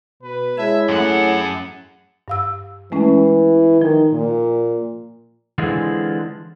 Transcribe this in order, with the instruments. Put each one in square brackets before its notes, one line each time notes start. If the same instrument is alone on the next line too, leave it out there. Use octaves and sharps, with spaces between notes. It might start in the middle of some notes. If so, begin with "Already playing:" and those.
[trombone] B2 [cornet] B4
[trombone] G#3 [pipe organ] E4 C#5 A5 [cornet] E5
[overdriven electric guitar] F#2 F#5 [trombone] A3 [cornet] G#4
[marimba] G2 F5 E6
[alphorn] E3 [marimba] G#3 A3 C#4
[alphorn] D#3 [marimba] F3
[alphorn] A#2
[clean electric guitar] D3 E3 G#3 C4 F4 G#4